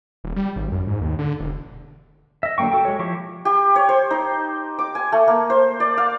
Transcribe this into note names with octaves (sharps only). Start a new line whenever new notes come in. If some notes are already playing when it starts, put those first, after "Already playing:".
D#1
G3
G#1
F#2
G#2
D#2
D3
E1
D#5 E5
D3 F#3 A#3 G5 C#6
F#4 A4 G5
G#3 C#5
F3 E4 G4 C#6
G4
C#5
C5
D#4
D6
G#5
A3
A#3
C5
D5
F5